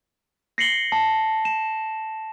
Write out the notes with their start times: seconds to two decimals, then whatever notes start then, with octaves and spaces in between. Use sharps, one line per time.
0.58 A#6 C7 C#7 F#7 G7
0.92 A5
1.45 E7